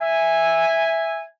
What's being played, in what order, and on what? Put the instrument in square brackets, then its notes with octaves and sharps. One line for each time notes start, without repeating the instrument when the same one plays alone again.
[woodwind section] E5 G#5